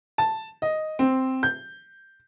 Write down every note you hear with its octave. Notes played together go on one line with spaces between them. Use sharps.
A5
D#5
C4
G6